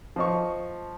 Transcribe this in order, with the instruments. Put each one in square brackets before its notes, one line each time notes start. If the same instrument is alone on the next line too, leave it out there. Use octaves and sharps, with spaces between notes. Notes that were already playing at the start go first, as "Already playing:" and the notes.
[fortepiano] F3 D#5 C#6